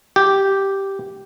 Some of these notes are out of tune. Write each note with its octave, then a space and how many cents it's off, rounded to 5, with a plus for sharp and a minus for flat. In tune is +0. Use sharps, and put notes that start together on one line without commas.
G4 -5